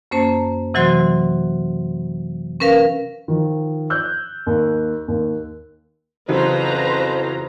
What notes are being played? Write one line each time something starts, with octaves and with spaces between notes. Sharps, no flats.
F#2 A#3 C#4 C5 A5
C3 E3 F#3 F#4 C5 C6
C#4 A#4 B4 F5 A#6
D#3 F3
E6 F#6 G6
D#2
D#2
F2 C#3 E3 F#3 B4 C5 A#5